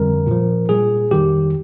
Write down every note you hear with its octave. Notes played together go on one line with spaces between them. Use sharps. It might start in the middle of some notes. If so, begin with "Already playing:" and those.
Already playing: F2 D3 G3 A#4
A#2 F3
A#2 G3 G#4
F2 D#3 G3 G4